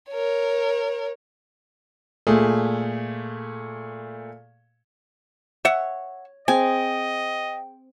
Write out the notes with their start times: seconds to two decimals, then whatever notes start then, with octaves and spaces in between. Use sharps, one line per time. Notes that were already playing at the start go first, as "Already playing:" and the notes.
0.10 A#4 C#5
2.27 A#2 A3 G#4
5.65 C#5 E5 F#5
6.48 C4 G#4 D#5 G5 G#5